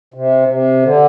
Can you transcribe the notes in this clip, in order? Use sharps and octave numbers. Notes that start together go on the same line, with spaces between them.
C3
C3
D3